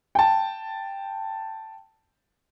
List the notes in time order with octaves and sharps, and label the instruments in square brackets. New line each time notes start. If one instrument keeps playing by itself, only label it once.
[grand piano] G5 A5